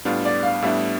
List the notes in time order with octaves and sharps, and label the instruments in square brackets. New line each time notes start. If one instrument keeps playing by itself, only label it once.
[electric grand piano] A2 G3 B3 D4 [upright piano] F4
[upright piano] D5
F5
[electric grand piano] A2 G3 B3 D4 [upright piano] E5